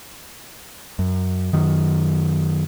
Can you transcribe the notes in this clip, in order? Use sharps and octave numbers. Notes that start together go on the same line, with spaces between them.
F#2
F#2 D#3